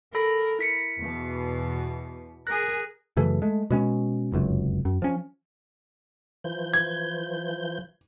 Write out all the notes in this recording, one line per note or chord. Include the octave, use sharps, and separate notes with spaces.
A4 A#4 B5 A#6
E4 B6 C#7
E2 B2
G#4 A#4 F#6 A#6
F#2 C#3 E3 A3
G#3 A3
B2 G#3 C#4
F1 C#2 F#2
F#2
F3 C#4
E3 F3 G6
G#6